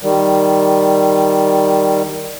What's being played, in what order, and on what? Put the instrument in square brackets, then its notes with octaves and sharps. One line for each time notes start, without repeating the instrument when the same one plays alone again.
[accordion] D#3 G3